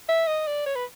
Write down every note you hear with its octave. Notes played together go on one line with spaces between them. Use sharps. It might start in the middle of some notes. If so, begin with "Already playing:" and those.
E5
D#5
D5
C#5
B4